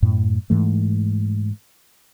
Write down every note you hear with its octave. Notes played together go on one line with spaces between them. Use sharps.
F#2 A2
G#2 E3 A3